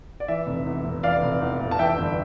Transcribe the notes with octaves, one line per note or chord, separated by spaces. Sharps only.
D5
E3 E5
F1
E2
F1
E3 D5 F5
F1
E2
F1
A5
E3 E5 G5
G1